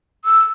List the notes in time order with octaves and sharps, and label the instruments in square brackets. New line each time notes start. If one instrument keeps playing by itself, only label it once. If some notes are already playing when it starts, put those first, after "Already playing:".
[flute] E6